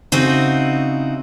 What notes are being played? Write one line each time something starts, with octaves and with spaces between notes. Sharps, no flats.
C#3 C4 D#4 E4 F#4